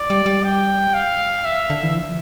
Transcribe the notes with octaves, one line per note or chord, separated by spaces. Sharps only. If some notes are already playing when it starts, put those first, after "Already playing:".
Already playing: D5
G3
G3
G5
F5
E5
D3
E3
F3